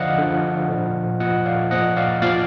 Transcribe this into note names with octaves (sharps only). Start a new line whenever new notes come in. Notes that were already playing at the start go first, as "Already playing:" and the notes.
Already playing: D3 F3 D5 D#5 F5 F#5
D3 F3
A#2 F3
A#2 F3 D#5 F#5
D5 F5
A#2 F3 D#5 F#5
D5 F5
A#2 F3 D5 F5